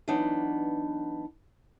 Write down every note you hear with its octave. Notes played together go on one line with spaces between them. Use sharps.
E3 F#3 B3 D4 D#4